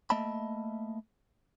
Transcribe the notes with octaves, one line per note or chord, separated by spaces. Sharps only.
A3 A#3 D#5 E5 A5 B5